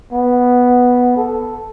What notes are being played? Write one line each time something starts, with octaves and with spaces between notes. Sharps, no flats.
B3
A4